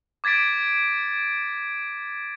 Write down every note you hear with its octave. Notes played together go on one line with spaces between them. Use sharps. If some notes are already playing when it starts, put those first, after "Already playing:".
D6 G#6 A6 B6 D7